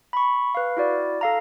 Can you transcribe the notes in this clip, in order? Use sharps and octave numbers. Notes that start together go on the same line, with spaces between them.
B5 C#6
B4 F5
E4 F#4 D5
A4 F5 A#5